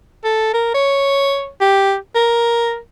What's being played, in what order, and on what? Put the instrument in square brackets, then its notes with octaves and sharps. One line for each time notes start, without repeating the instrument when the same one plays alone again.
[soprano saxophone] A4
A#4
C#5
G4
A#4